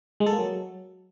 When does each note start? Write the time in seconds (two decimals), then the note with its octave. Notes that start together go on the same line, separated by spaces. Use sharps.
0.20 G#3
0.26 A4
0.33 A#3
0.39 F#3